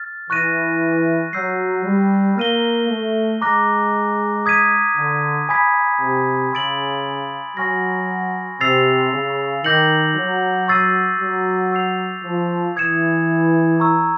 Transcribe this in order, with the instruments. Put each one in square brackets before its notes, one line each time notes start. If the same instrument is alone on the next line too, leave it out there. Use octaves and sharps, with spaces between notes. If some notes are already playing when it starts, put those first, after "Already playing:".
Already playing: [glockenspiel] F6 A6
[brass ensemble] E3 [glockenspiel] C#6 F#6 A#6 D#7
[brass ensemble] F#3 [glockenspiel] E6 G6 C7
[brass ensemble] G3
[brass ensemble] A#3 [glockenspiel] F6 A#6 D#7 G7
[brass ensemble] A3
[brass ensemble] G#3 [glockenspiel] A#5 D6 F#6 A#6
[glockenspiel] D#6 G#6 B6 D#7
[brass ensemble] D3
[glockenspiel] G#5 B5 D#6 G#6 B6
[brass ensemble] C3
[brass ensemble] C#3 [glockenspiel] C6 E6 A6 D7 F#7
[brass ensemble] F#3 [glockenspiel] G#5 C#6 F6 A#6
[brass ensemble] C3 [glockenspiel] E6 A6 C7 F7
[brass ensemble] C#3
[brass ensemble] D#3 [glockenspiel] D6 G6 A#6 C#7 F#7
[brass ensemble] F#3
[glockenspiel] C#6 E6 A6 C7 D#7
[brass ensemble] F#3
[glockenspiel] C#6 E6 G6 C7 F7
[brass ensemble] F3
[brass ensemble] E3 [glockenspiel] D#6 G#6 C#7 E7
[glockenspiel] A#5 C#6 E6